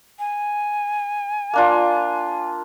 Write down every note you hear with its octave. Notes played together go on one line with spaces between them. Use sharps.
G#5
A#3 D4 F4